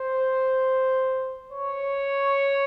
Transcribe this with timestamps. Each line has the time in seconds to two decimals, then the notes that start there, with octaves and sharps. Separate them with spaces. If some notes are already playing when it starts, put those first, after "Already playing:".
Already playing: C5
1.52 C#5